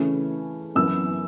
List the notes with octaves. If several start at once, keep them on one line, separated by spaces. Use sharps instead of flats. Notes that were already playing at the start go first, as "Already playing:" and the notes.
Already playing: C#3 E3 A3 C#4
F#2 E3 B3 E6